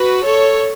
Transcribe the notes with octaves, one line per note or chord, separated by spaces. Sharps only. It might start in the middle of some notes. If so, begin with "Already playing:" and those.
Already playing: F#4 B4
A4 C#5